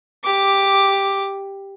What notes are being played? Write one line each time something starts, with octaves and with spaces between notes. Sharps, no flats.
G4 D6